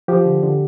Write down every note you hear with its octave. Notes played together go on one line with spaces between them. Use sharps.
F3 G4
D3
D3